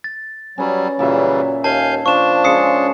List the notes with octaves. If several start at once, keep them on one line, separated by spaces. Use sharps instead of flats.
A6
F#3 G3 C#4 B4
A#2 C#3 E3 F#3 G3 E5
D#2 F5 G#5 A5 G6
F3 D4 C#6 E7
C#3 G#3 D#6 C7 C#7